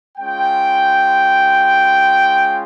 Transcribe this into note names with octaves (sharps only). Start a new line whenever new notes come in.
G#3 C#4 F4 G5